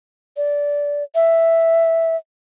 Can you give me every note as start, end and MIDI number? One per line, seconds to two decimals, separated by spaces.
0.37 1.03 74
1.15 2.17 76